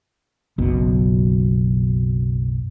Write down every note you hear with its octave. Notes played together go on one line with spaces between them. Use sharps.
F#1 B1 B2